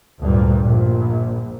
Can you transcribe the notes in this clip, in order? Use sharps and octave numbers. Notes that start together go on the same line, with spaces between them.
D2 G2 A#2
A#1